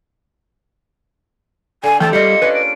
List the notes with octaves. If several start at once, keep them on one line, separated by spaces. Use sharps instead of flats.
D3 G#5
E3 A3 C4 G4 G5 A5
G3 A#3 F4 C5 D#5 C#7
C#4 D4 B4
D7